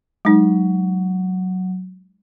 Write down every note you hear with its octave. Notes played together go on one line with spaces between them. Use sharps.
F#3 G#3 D#4